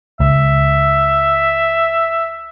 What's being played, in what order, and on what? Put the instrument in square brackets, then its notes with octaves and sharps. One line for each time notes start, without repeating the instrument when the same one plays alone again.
[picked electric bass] C#2 [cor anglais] E5